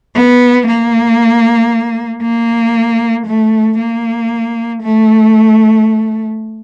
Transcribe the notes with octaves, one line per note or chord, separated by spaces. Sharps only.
B3
A#3
A#3
A3
A#3
A3